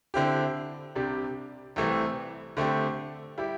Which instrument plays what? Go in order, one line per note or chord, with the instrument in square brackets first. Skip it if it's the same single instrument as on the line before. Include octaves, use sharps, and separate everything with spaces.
[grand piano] D3 C4 E4 G4
C2 C3 G3 D4 G4
C2 C3 E3 A3 C4
D3 A3 C4 G4
G3 E4 G4